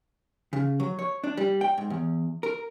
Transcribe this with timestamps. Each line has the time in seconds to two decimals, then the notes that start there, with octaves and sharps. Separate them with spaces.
0.53 C#3
0.80 F#3
0.99 C#5
1.24 D4
1.37 G3
1.61 G5
1.78 G#2
1.90 E2
2.43 A#4